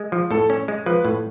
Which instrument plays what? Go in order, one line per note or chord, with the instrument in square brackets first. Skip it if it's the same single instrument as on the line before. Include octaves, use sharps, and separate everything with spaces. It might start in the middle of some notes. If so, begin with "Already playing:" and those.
Already playing: [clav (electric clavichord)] G#3
F3
[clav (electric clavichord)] A2 [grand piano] A4
[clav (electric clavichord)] C#4
G#3
[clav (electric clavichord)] F3 [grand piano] B4
[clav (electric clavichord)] A2